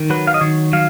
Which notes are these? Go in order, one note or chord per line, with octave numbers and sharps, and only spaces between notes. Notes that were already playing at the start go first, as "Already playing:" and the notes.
Already playing: D#3
F#3 B4
F5
D#5
D#3 C#5
F#3 F5